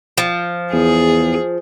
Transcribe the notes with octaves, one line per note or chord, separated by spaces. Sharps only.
F3
E2 G#4